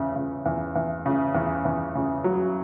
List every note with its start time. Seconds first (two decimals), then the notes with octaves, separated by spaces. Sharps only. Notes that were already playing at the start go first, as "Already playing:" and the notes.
Already playing: E2 C#3
0.16 C#3
0.46 E2
0.75 E2
1.06 C#3
1.35 E2
1.65 E2
1.95 C#3
2.24 F#3